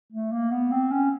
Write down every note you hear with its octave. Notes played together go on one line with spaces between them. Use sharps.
A3
A#3
B3
C4
C#4